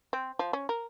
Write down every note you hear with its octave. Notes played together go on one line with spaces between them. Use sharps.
C4
F3
C#4
A#4